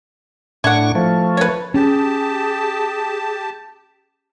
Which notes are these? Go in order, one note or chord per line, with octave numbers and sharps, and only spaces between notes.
A2 D4 E4 F#5 C#6
F3 A3
B4 C#5
C#4 G4 G#4 A5